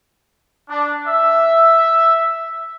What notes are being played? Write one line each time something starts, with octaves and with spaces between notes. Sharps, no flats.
D4
E5